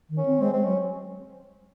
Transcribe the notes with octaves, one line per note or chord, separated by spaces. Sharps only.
D#3
C#4
C4
G#3 C4
G#3 C4
F#3 C#4